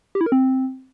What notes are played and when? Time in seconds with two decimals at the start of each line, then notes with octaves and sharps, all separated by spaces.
0.15 G4
0.21 E4
0.26 A#4
0.32 C4